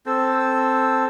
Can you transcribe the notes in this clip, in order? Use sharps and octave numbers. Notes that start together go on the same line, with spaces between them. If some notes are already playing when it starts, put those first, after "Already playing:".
C4 A4